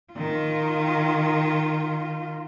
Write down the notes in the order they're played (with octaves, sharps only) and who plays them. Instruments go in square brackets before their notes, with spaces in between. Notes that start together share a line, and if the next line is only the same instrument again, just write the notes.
[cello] D#3 F4